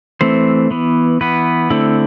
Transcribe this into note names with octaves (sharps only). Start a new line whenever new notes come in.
E3 A3 C4 C5
E3 B3
E3 B3 B4
D3 A3 C4 E4